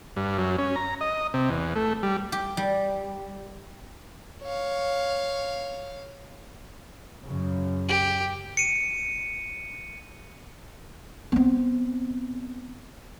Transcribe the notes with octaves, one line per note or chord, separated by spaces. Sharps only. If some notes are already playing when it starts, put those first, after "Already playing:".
G2
F#2
C#4
A#5
D#5
C3
E2
A3
G3
G4
G3
C#5 F5
F#2 C#3
G4
C#7 D#7
B3 C4